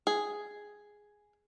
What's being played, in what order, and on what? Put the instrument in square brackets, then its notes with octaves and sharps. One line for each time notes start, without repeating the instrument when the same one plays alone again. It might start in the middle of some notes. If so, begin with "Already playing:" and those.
[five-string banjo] G#4